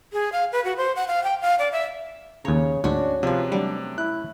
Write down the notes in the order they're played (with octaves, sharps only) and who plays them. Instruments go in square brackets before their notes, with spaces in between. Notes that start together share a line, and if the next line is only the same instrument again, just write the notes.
[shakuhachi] G#4
F5
B4
F#4
C5
F#5
F5
G5
F5
D5
E5
[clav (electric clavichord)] D#2 A#5 [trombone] C#3 [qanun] C#5
[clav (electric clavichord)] D2 G#2 [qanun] C#4 F#4 [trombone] D4
[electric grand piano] C3 [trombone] F3 [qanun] G#4 B4
[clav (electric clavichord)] F#3 G3 [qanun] A3 [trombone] D4
[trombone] E4 [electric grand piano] F#6